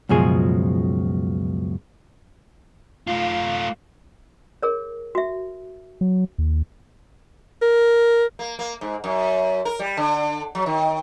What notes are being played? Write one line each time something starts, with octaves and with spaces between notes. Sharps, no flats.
C#2 F#2 B2 F3 G#4
A3 F4 F5
G#4 A#4 C#5
F#4 E5
F#3
D#2
A#4
A#3
A#3
G#2
F#2
A#4
G3
D3
F#3
D#3